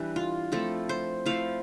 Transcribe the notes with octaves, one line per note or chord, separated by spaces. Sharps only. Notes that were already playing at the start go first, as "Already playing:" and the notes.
Already playing: E3 G3 D4
F4
F3 A3 C4 E4 A4
C5
F3 A3 C4 E4 F5